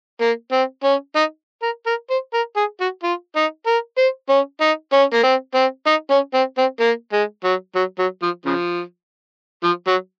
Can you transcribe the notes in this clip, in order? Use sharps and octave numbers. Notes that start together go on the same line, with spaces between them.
A#3
C4
C#4
D#4
A#4
A#4
C5
A#4
G#4
F#4
F4
D#4
A#4
C5
C#4
D#4
C#4
A#3
C4
C4
D#4
C#4
C4
C4
A#3
G#3
F#3
F#3
F#3
F3
C#3 F3
F3
F#3